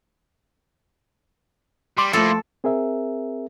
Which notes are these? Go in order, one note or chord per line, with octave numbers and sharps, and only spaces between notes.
G3 C6 D6
F3 A3 A#3 E4 A4
C4 G#4 A#4 E5